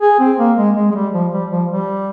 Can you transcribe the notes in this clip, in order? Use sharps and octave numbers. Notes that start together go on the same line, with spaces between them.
G#4
C4
A#3
G#3
G#3
G#3
G3
F3
G3
F3
G3